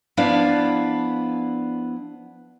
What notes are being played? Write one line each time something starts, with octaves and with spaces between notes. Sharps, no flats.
F3 B3 D4 E4 D5 F5